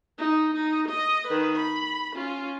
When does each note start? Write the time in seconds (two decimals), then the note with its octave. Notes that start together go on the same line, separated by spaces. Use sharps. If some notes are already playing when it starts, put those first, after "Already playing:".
0.18 D#4
0.55 D#4
0.89 D#5
1.28 D#3 B4
1.57 B5
2.16 C#4 F4